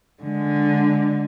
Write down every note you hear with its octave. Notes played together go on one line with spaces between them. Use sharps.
D3 G#3